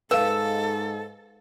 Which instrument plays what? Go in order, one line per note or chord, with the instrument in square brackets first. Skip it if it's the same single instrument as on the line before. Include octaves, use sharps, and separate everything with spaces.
[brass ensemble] G#2 [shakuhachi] A4 [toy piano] B4 F5 [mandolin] E6